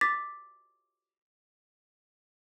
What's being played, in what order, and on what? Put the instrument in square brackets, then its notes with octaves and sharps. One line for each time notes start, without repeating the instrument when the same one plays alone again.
[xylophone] D6 A6 B6